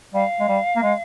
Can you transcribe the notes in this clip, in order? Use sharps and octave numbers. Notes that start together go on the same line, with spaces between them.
G3 F5
G#3
G3
A#3
G#3